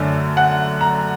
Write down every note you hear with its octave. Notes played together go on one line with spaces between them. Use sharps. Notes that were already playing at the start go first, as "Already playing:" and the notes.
Already playing: F#2 D3 A3
F#5
A#5